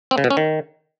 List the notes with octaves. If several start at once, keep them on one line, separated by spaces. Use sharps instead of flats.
C4
C#3
B2
C#4
D#3